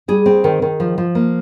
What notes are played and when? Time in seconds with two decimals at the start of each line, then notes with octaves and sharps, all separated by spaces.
0.08 G3 G#4
0.26 C4
0.44 D#3
0.62 D#3
0.80 F3
0.98 F3
1.15 A#3